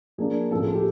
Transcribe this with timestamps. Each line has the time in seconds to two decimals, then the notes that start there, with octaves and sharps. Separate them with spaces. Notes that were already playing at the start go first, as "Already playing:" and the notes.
0.18 F3 A#3 D4 G#4
0.51 A2 F3 A3 A4
0.60 G#4
0.67 A4
0.75 G4